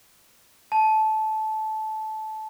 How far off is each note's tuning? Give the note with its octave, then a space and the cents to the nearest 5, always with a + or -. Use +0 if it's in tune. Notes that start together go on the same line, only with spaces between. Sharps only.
A5 -15